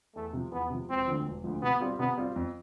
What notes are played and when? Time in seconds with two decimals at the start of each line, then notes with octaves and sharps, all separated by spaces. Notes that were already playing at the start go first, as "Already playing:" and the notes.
0.16 E2 A3
0.33 C3 F3
0.52 E2 B3
0.70 C3 F3
0.89 E1 C4
1.07 D2 D3 F3
1.26 E1
1.44 D2 D3 F3
1.62 C3 B3
1.80 G3 C4 F4
1.99 C3 B3
2.17 G3 C4 F4
2.36 F2